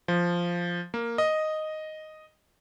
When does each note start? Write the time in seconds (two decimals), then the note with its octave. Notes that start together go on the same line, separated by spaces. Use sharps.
0.08 F3
0.94 A#3
1.18 D#5